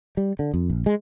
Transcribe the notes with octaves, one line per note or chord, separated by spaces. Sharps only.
G3
D3
F2
A#1
G#3